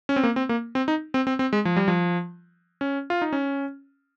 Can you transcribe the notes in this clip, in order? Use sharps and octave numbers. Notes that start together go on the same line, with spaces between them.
C#4
C4
A#3
C4
A#3
C4
D#4
C4
C4
C4
G#3
F3
G3
F3
C#4
F4
D#4
C#4